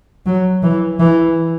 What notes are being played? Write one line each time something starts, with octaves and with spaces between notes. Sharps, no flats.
F#3
E3
E3